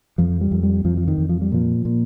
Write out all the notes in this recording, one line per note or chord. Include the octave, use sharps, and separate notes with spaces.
F2 F3
G3
F2
G3
F2 F3
F3
D#3
F2
F3
G3
A#2 F3
A#2